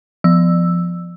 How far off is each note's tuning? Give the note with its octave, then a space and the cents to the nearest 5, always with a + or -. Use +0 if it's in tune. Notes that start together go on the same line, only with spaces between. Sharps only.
F3 +0 E6 +0